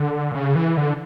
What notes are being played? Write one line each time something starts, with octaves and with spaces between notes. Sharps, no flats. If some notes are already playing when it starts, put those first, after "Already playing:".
Already playing: D3
A#2
C#3
E3
D3